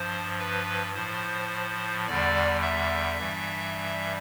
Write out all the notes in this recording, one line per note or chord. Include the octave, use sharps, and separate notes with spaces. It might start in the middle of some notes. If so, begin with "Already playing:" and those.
Already playing: G2 F3 C5
B4
A2 F3 C5
E2 D3 G3 D5
E5
G2 E3 G3